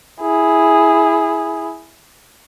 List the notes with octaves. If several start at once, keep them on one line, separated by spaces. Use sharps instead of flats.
E4 G#4